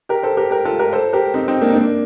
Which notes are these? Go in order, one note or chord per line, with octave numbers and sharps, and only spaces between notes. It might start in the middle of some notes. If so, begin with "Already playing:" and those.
G4 A#4
A4 C5
G4 A#4
G4 A#4
F4 A4
G4 A#4
A4 C5
G4 A#4
C4 D#4
C4 D#4
A#3 D4
D#4
A#3 D4